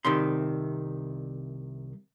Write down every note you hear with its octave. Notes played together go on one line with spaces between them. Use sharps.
C2 C3 D#3 C6